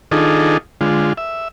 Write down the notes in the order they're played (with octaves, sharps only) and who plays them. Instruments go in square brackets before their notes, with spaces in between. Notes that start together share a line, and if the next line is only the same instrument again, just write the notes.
[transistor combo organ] D#3 D4 D#4 F4 G#4 A4
D3 G#3 F4
E5